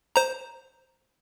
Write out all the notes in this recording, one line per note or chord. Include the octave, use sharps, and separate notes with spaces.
C5 A#5